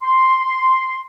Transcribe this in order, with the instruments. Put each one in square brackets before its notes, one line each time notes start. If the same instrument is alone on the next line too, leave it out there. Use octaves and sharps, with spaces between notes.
[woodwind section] C6